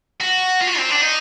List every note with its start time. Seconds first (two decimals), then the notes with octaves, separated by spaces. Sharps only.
0.21 F#4
0.61 F4
0.67 F#4
0.78 C4
0.90 D4
1.01 D#4